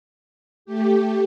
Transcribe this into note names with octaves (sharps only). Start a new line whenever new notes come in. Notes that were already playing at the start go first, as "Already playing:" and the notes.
A3 G4